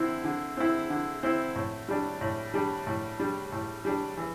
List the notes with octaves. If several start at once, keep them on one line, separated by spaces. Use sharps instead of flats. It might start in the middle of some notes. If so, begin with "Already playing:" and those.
Already playing: D3 C4 E4
D3
C4 E4
D3
C4 E4
A2
G3 D4
A2
G3 D4
A2
G3 D4
A2
G3 D4
E3